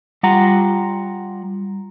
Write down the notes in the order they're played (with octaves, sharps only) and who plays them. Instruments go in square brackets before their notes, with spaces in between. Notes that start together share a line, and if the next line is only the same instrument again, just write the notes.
[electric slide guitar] G3 F4 F#5 A#5